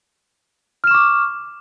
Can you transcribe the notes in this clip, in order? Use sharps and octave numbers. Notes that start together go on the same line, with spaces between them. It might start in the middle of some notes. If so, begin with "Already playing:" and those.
C#6 D6 F6 E7